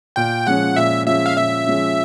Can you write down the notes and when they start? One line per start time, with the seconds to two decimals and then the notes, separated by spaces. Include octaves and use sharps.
0.16 A#2 G5
0.47 F3 G#3 C#4 F#5
0.76 A#2 E5
1.06 F3 G#3 C#4 E5
1.26 F5
1.36 A#2 E5
1.66 F3 G#3 C#4